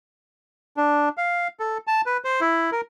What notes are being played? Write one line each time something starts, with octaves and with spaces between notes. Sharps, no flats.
D4
F5
A4
A5
B4
C5
E4
A#4